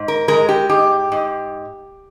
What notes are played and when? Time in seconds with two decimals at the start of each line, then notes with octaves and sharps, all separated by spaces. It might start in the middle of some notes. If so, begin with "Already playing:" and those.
Already playing: G#2
0.08 A#4
0.28 G#3 A#4
0.49 G4
0.69 G#2 G4
1.12 G#2